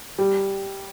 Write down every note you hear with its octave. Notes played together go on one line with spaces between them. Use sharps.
G3